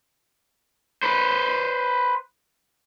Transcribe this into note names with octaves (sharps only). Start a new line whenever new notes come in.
B4 C5